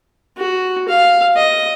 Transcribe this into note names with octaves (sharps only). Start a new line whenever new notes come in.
F#4
F5
D#5